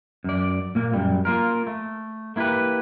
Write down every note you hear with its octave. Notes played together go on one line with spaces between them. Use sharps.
F#2 D5
A#2 A#3
F#2 G3
A#3 F4 A#4
A3
A#3 E4 F4 G4 B4